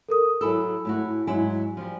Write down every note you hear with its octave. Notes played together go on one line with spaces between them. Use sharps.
A4 A#4 D#6
F#3 E4 A4 G#5 B5 E6
A2 E4 F#4
G#2 F#3 E4 G#5
F3 G3